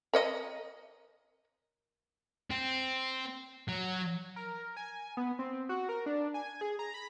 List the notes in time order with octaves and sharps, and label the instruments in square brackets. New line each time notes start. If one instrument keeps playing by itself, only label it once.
[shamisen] A#4 C#5 D#5
[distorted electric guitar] C4
F#3
[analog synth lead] A#4
G#5
B3
C4
F#4
A#4
D4
G#5
G#4
A#5
B5